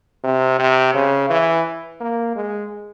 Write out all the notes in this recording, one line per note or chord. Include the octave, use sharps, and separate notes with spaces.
C3
C3
C#3
E3
A#3
G#3